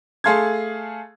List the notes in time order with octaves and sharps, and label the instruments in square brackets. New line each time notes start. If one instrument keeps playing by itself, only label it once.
[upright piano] A3 G#4 A4 F5 C6 G#6